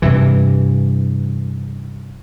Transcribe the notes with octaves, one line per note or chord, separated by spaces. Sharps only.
G2 C3 E3